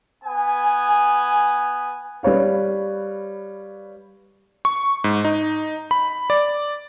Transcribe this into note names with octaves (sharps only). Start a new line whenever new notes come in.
B3 G#5
G3 B4 C#5 F5
C#6
G#2
D#4
B5
D5